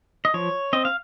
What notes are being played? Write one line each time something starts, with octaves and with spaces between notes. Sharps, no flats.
D#5
F3 C#5
C4 D#5
F5